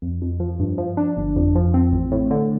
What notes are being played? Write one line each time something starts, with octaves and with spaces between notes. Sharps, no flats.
F2
F2
F3
G2
F3
D4
G1
F2
F3
C4
A1
A2
D3